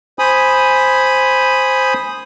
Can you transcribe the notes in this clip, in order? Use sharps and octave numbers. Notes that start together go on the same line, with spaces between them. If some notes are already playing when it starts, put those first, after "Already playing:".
C5 G#5 B5 D#6